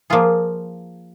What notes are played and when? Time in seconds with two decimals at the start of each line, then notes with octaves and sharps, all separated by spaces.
0.10 F3 A#3 F4 G#4